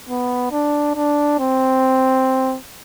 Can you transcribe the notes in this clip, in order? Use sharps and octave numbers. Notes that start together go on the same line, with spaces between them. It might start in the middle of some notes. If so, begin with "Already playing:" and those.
B3
D4
D4
C4